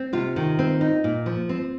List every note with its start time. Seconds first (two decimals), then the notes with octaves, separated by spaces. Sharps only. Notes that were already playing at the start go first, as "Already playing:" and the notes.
Already playing: C4
0.13 C3 F4
0.36 D#3
0.59 C4
0.81 D#4
1.04 A#2
1.26 F3
1.49 C4